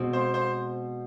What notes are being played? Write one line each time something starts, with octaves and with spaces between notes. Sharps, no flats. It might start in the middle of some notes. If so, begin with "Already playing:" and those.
Already playing: B2 G#3 C4
C5
C5